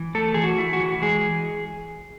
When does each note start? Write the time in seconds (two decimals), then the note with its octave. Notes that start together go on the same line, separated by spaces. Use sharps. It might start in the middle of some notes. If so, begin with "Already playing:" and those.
Already playing: E3
0.15 A3 A4
0.34 E3 G#4
0.44 F#4
0.58 E4
0.73 F#4
0.80 E3
1.02 G#3 G#4